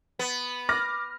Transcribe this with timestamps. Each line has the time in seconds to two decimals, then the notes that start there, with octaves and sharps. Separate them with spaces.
0.19 B3
0.69 D6 F6 A#6